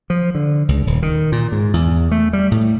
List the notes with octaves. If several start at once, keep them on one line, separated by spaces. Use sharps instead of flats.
F3
D3
C#2
D#1
D#3
A#2
G#2
E2
A3
G3
A2